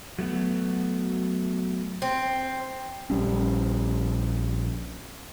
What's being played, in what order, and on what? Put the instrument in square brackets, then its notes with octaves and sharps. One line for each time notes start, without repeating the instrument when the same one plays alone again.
[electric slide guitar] F#3 A3 B3 F#4
[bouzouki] C4
[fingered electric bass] A#1 G3 C#4